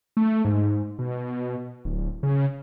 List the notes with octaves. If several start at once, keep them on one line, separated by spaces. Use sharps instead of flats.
A3
G#2
B2
D1
C#3